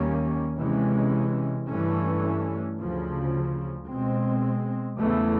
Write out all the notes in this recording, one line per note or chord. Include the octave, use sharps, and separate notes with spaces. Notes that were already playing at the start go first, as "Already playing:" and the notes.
Already playing: D#2 D#3 G3 A#3 C#4
C3 E3 G#3 C#4
G2 E3 A3 C#4
D2 C#3 F3
B2 G#3 C4
E2 C#3 E3 A3